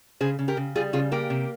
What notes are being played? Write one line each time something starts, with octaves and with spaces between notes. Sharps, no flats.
C#3 G#4 C5
C#3
G4 A#4
C#3
G3 F4 G#4
C#3 F4 G#4
A#3 G4 A#4
C3